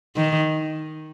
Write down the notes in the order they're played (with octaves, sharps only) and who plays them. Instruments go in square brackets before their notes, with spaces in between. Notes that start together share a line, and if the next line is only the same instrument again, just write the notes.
[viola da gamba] D#3